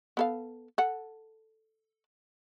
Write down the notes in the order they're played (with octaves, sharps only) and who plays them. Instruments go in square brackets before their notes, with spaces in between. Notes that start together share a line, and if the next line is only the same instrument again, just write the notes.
[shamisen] B3 A4 F5
A4 F#5